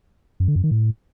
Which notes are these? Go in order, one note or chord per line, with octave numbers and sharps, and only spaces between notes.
F#2
D3
F#2
D#3
A2